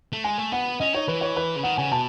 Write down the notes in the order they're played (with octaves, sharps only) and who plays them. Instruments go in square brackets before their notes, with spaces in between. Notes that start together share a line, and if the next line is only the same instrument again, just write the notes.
[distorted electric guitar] A3
[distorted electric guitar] G#3 [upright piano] G#5
[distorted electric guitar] A3
[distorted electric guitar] B3 [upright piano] F#5
[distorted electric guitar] C#4 [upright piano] D#5
[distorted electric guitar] D#4 [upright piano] C#5
[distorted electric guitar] E3 [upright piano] B4
[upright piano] C#5
B4
[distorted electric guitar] C#3
[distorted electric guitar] D#3 [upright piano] F#5
[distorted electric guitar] C#3 [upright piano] G#5
[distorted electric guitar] B2 [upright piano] A5